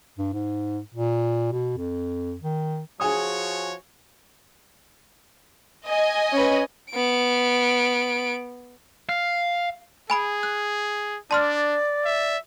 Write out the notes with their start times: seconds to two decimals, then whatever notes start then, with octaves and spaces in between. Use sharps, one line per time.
0.18 G2
0.33 G#2
0.94 A#2
1.52 B2
1.78 F2
2.42 D#3
3.00 F3 F#4 G#4 C#5 G#5 D#6
5.86 D#5 G#5
6.32 C#4 B4
6.91 B3 D7
9.09 F5
10.10 G#4 G#5 B5 D7
10.43 F#6
11.31 D4 D5 A5 C6 F6
12.05 E5